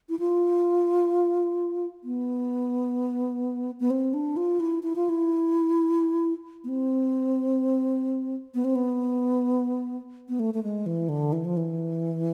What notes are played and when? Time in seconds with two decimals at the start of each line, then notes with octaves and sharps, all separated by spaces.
0.09 E4
0.19 F4
2.04 B3
3.80 B3
3.90 C4
4.14 D4
4.37 F4
4.60 E4
4.83 E4
4.96 F4
5.09 E4
6.64 B3
6.69 C4
8.55 B3
8.64 C4
8.75 B3
10.29 B3
10.40 A3
10.54 A3
10.63 G#3
10.86 E3
11.09 D3
11.32 E3
11.45 F3
11.57 E3